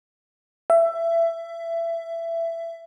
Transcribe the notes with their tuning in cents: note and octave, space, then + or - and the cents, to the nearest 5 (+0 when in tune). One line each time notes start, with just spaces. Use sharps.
E5 +20